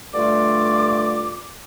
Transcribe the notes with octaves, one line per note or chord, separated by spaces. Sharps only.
G2 D3 A3 F4 D5 D6